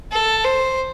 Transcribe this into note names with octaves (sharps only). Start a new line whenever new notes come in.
A4
C5